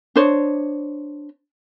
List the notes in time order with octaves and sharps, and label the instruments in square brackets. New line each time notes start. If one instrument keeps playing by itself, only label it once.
[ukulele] D4 C5 C#5